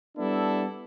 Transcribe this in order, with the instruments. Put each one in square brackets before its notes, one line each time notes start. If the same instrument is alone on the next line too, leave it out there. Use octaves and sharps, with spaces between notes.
[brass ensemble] G3 B3 D4 E4 A4